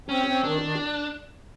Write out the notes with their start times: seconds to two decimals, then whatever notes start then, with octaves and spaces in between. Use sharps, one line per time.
0.08 C4 C#4
0.27 C4
0.44 D#3 D4
0.61 D#3